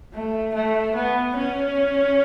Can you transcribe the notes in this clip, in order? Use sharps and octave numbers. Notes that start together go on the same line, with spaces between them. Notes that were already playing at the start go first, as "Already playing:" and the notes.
A3
A3
B3
C#4